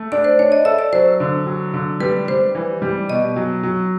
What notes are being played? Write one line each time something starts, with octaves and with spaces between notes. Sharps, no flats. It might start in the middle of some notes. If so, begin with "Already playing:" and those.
Already playing: A3
D4 D5
C5
D4 C#5
D#5
A4 E5
D5
F#3 C5
D3
F#3
D3
G3 B4
G3 C5
E3
G3
B2 D#5
F#3
F#3